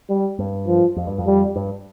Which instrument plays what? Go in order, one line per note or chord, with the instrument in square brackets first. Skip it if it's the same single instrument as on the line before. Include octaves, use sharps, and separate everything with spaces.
[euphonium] G3
[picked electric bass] G2
[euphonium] F3
[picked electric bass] F2
G2
F2
[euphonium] G3
[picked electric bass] G2